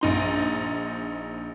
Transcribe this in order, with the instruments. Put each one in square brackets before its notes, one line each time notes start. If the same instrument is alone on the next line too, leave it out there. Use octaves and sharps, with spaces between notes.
[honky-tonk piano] A#1 D#4 C6